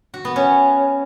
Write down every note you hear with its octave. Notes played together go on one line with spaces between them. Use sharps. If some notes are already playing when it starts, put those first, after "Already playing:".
F#4
B3
C#4